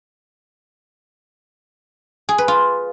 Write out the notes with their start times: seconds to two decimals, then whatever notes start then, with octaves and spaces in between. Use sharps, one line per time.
2.29 G#4
2.38 B4
2.48 F4